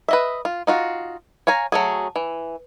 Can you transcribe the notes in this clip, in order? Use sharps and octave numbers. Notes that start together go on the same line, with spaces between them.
B4 D#5 E5
F4
D#4 F4 F#4
C#5 F5 G#5 A#5
F#3 A3 G#4
E3